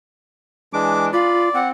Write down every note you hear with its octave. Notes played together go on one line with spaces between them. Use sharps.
E3 G#3 D4 D6
F4 D5 B5
C4 F#5